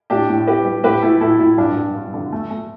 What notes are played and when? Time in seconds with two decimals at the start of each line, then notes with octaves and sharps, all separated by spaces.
0.10 A2 D4 G4
0.29 A2
0.47 B3 G4 B4
0.65 G3
0.84 A2 G4 B4
1.02 A3 E4 A4
1.21 A2 E4 A4
1.39 A2 E4
1.57 G2 D4
1.76 G2
1.95 G2
2.13 D3
2.32 A3
2.50 A3